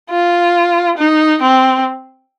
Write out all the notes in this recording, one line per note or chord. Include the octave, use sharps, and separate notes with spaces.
F4
D#4
C4